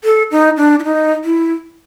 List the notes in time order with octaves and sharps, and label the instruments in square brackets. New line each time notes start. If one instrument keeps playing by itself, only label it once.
[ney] A4
D#4
D4
E4
D#4
E4